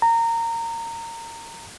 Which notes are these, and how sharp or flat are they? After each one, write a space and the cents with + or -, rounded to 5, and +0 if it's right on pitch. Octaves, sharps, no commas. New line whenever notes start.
A#5 -20